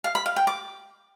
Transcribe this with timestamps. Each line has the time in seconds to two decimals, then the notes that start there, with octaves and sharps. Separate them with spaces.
0.04 F5
0.15 B5
0.26 F5
0.36 G5
0.47 D6